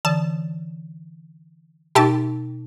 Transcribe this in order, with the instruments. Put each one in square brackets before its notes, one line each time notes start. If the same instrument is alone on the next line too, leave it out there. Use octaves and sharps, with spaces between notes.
[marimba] D3 E3 [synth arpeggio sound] A5
[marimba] B2 D#4 [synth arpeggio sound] G4 E5 A5